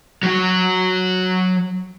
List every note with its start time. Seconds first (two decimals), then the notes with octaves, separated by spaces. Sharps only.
0.23 F#3 F#4